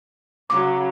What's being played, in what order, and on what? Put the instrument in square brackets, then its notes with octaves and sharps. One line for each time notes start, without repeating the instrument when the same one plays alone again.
[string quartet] C#3 F#3 [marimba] D6